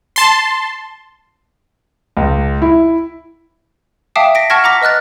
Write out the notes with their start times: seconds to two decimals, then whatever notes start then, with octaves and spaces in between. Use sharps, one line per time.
0.16 A5 C6
2.17 C#2
2.62 E4
4.16 E5 F5 G5 A5 D6 D#6
4.35 A#6 B6 D7
4.50 F#5 A5 C#6 F6 G#6 A#6
4.64 F#5 A#5 D6 A#6 B6
4.82 B4 D#5 F6 F#6 A6